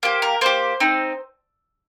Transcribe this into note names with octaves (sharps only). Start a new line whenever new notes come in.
A#3 G4 C5
A#4
A#3 G4 C5
C4 D#4